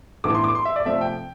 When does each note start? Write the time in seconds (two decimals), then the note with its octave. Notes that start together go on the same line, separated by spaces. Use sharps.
0.24 A2 E3 B3 D4 D6
0.34 C6
0.44 D6
0.55 C6
0.65 E5
0.76 D5
0.85 C3 F3 A3 E5
1.01 G5